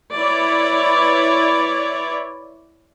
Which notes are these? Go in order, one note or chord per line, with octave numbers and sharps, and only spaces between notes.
E4 B4 C#5 D5